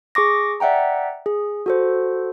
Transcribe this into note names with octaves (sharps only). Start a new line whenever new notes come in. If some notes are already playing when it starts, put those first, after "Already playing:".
G#4 C#6 D6 A#6
D5 E5 F#5 G5 A#5
G#4
F#4 A4 C5